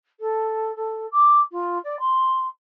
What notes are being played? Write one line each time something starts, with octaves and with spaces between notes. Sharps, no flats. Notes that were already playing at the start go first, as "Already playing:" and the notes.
A4
A4
D6
F4
D5
C6